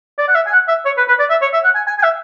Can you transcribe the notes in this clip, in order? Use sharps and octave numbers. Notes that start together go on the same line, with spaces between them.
D5
F#5
E5
G#5
F#5
E5
C#5
B4
B4
D5
E5
C#5
E5
F#5
G#5
G#5
G#5
E5